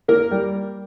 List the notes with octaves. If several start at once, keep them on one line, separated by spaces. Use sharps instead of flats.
A#3 A#4
G3